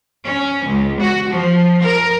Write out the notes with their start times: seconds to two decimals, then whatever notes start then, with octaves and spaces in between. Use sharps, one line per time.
0.25 C#4
0.66 C#2
1.01 F#4
1.29 F3
1.83 A#4